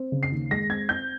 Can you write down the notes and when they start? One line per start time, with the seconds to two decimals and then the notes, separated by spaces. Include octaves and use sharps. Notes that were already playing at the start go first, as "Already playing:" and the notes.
Already playing: C4
0.12 C#3
0.23 C7
0.32 D#2
0.51 G#3 A#6
0.70 C4 G#6
0.89 C4 G6